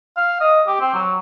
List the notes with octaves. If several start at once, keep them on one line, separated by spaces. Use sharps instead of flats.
F5
D#5
G4
C4
F#3